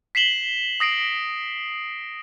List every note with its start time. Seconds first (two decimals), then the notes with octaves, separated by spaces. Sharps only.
0.15 B6 C7 E7 F#7 G7
0.80 D#6 A#6 C7 D7